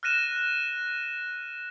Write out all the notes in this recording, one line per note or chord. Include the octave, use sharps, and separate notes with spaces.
F6 F#6 A#6 D#7 E7